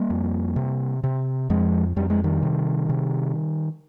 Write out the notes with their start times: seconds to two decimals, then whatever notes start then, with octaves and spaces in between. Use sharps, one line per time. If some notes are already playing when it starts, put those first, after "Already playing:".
Already playing: G3 A#3
0.10 F2
0.56 C3
1.04 C3
1.50 F2 F3 G#3
1.96 F2 G3
2.10 G#3
2.24 D#3 G3
2.43 C3
2.89 C3